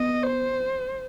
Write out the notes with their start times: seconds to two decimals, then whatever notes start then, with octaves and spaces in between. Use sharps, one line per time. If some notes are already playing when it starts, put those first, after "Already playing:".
Already playing: B3 D#5
0.23 C5